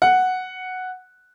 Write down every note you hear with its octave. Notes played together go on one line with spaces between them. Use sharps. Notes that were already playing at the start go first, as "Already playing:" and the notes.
F#5